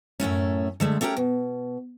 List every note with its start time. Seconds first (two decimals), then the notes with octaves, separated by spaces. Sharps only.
0.20 F#2 A2 A3 C#4
0.80 D3 G#3 A3
1.01 A3 C#4 G4 A#4 G5
1.17 B2